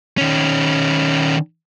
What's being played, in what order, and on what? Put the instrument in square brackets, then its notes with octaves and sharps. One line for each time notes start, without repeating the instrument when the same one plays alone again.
[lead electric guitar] D#3 C#4